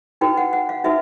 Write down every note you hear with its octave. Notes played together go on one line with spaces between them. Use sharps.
D#4 F#4 B4 G5
F#5
F#5
F5
D#4 F#4 B4 E5